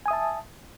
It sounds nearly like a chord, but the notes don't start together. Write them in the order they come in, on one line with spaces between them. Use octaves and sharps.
G#5 D#6 E5 A5